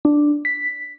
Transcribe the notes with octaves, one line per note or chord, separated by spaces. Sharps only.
D4
B6